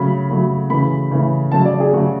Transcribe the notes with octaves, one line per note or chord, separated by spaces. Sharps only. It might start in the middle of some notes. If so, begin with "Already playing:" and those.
Already playing: C#3 F#3 A3 B5
C#3 F#3 A3
C#3 E3 A3 B5
C#3 E3 A3
C#3 F#3 A3 A5
D5
G#4
C#3 F#3 A3 F#4